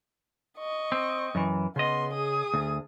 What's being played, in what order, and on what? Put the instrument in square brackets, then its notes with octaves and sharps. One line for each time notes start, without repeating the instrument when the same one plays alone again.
[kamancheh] D#5 C#6
[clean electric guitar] C4
F#2 E3
[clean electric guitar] C#3 D#5 [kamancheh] B3 C6
[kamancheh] G#4 D#6
[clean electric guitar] D2